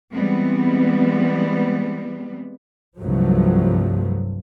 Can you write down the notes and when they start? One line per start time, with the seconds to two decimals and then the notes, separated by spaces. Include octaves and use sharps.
0.12 E3 G3 G#3 B3 C4
3.00 C2 G2 F3 F#3 A3